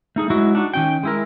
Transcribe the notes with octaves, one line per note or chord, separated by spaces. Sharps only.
A3 D#4 G#4
F#3 G#3 E4 F#4
D4 D#4 F#4
D#3 C#4 G5
G#3 E4 A#4